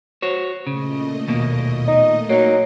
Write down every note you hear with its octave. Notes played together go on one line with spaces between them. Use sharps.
F#4 C5 C#5
A#2 C#3 A3 D#5
D#2 B2 A#3
D#4
F#3 A#3 D#4